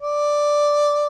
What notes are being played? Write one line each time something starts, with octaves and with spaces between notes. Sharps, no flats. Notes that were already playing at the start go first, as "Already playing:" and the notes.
D5